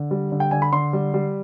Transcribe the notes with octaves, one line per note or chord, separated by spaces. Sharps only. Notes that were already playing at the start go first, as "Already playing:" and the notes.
Already playing: D3
G3
D3
G5
D3 G#5
B5
D3 C6
G3
G3